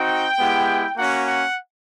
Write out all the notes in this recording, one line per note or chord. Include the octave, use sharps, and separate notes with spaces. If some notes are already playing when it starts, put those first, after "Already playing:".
Already playing: C4 D#4 F#4 G5
G#3 B3 E4 G4
A#3 C#4 F#4 F#5
F#5